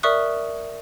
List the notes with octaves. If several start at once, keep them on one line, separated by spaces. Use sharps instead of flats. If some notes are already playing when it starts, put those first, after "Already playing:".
A#4 D5 E5 C#6 D#6 F#6